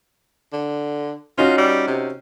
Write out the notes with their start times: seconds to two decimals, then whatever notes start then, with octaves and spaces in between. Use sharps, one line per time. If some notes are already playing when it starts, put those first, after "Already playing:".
0.53 D3
1.38 C#4 D#4 F4 F#4
1.58 G3
1.87 C3